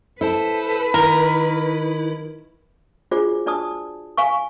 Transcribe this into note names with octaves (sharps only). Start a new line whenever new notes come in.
E4 A4 B4 C5 A5
D#3 E4 A#4
D4 F4 F#4 G#4 C5 D5
D4 D5 A5 D#6
F5 G#5 C#6